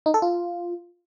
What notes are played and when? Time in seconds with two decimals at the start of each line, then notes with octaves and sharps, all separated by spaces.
0.06 D#4
0.14 A4
0.22 F4